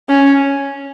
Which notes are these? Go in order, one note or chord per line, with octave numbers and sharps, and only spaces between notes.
C#4